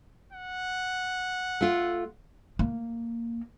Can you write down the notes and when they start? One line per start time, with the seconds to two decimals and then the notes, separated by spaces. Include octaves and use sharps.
0.33 F#5
1.61 A3 F4
2.59 A#3